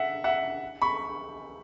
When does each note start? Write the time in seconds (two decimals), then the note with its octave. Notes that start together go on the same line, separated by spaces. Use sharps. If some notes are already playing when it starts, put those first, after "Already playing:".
Already playing: E5 F#5
0.24 E5 F#5
0.82 B5 C#6